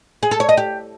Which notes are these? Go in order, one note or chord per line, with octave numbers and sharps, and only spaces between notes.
G#4
A4
C#5
D#5
G4